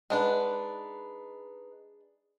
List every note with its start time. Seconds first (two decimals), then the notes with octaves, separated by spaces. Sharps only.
0.10 G#3 D4 D#4 B4 F#5